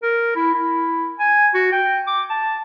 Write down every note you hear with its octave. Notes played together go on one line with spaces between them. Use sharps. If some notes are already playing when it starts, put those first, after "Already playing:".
A#4
E4
E4
G#5
F#4
G5
D6
A5